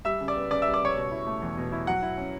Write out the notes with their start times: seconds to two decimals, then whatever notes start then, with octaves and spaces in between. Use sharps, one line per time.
0.05 G3 E5 E6
0.21 C#3
0.28 D5 D6
0.36 B3
0.51 C#3 D5 D6
0.62 G3 E5 E6
0.74 D5 D6
0.81 C#3 C#5 C#6
0.96 B2
1.11 E4
1.26 A3
1.42 E2
1.57 B2
1.72 E4
1.87 F#3 F#5
2.02 E4
2.18 C#4